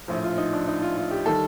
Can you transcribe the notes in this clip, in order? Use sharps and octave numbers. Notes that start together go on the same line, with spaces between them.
A#1 A2 F3
F4
D#4
D4
D#4
F4
F4
G4
D#3 G3 A4